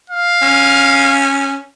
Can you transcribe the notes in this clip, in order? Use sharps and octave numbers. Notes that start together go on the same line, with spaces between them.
F5
C#4